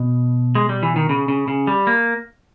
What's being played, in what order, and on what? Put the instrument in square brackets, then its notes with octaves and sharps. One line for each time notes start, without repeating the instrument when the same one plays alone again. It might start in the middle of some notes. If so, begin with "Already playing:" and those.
Already playing: [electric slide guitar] B2
G#3
G3
E3
D#3
C#3
C#3
C#3
G3
A#3